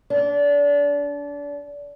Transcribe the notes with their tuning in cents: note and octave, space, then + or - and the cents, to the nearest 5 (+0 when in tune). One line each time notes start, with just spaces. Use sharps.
D4 -30